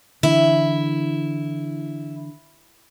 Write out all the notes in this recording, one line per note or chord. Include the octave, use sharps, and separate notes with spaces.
D3 E3 E4